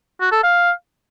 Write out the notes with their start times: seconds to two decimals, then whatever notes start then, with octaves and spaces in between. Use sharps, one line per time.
0.20 F#4
0.32 A4
0.43 F5